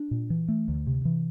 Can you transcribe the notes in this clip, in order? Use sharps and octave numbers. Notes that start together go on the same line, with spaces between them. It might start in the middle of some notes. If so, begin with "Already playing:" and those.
Already playing: D4
A#2
E3
A3
D2
C3
E3